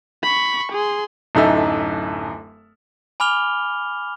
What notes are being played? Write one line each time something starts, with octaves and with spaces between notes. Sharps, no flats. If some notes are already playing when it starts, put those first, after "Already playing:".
B5 C#6
G#4 C6
D1 F#2 D#4 A4 E5
G#5 B5 D6 F6 F7 G7